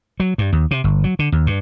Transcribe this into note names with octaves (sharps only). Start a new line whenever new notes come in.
F#3
G2
D#2
C3
G1
F#3
D3
D#2
G2